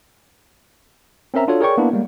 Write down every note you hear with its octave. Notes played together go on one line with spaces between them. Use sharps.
C4 C#4 A#4 E5 A#5
D4 F4 F#4 A4 C#5
G#4 A#4 C#5 D5 G5 C#6
A#3 B3 D4 E4
G3 G#3 A#3